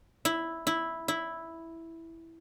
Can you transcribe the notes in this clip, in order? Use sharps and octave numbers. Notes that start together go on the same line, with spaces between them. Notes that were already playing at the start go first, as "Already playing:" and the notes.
E4
E4
E4